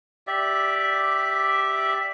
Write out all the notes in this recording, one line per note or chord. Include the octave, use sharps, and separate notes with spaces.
G4 D5 E5